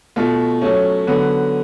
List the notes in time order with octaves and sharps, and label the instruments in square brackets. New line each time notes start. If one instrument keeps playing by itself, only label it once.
[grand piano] B2 A3 F4
F#3 A3 C#4
D3 F#3 B3